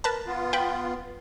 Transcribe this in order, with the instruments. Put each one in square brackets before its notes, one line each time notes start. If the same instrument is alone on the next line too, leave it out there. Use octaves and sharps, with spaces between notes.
[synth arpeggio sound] A#4 B4 A5
[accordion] B3 F4
[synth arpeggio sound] B4 G5